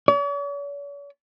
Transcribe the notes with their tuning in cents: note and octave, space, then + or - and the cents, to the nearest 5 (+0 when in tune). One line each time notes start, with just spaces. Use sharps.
C#5 +45